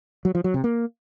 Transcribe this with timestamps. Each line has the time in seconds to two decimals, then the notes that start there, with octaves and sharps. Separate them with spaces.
0.25 F#3
0.35 F3
0.44 F#3
0.54 C3
0.64 A#3